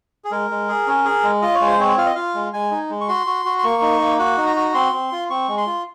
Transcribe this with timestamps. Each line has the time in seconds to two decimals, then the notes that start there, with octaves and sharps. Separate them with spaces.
0.25 G#4
0.31 G#3 A#4
0.50 G#3
0.68 G#4
0.87 C#4
1.05 G#4
1.23 G#3
1.42 F4 D#5
1.55 C#5
1.60 G#3
1.67 C5
1.79 C4 C#5
1.97 F4 F5
2.06 D#5
2.15 F4 F5
2.35 G#3
2.53 G#3 G#5
2.71 D#4
2.90 G#3
3.01 C#6
3.08 F#4 C6
3.26 F#4
3.45 F#4
3.58 C6
3.64 A#3 C#6
3.82 D#4
4.01 A#3
4.19 F#4 F#5
4.37 D#4
4.46 A#5
4.56 F#4
4.69 A#5
4.74 C4 C6
4.93 C4
5.12 F4
5.30 C4 C#6
5.48 G#3
5.58 C6
5.67 F4